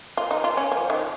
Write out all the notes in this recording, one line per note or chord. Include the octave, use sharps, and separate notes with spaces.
F4
D#4
F4
C#4
F3
D#3